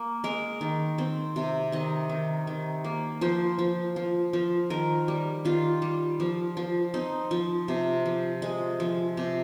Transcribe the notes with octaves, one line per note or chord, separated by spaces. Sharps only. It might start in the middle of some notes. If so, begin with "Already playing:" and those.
Already playing: A#3
G#3 A#4
D#3
C4
C3
D#3 D#5
D#3
D#3
A#3
F3 C5
F3
F3
F3
D#3 A#4
G3
D#3 F4
G3
F3
F3
C4 D#4
F3
C3
F3
G#3
F3
C3